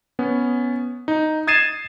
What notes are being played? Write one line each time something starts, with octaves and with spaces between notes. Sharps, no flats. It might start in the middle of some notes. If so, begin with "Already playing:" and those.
B3 C#4
D#4
D#6 G#6 A6 C7 D#7 E7